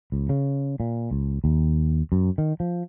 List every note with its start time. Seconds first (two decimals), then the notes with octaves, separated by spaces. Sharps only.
0.12 C#2
0.29 C#3
0.80 A#2
1.11 C#2
1.44 D#2
2.12 F#2
2.38 D#3
2.60 F3